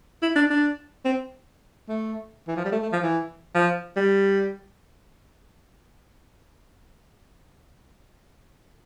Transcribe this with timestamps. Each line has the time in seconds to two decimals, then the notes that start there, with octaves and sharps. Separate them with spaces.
0.22 E4
0.35 D4
0.50 D4
1.05 C4
1.88 A3
2.48 E3
2.56 F3
2.64 G3
2.72 A3
2.82 A3
2.93 F3
3.03 E3
3.55 F3
3.96 G3